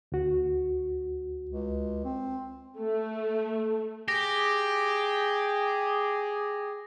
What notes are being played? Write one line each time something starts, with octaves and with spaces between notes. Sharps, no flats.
D2 F#4
C#2
C4
A3
G4 G#4 A#6